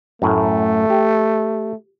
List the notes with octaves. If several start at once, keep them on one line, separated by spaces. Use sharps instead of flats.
F#2 A2 A3
G4